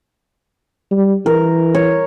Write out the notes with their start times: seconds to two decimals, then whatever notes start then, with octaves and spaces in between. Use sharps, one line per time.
0.91 G3
1.26 E3 A#4
1.75 C#5